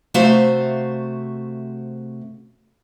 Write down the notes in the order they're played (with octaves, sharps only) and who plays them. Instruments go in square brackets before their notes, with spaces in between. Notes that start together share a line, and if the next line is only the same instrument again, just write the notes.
[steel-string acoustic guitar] C3 A3 F#4 C5 E5 F5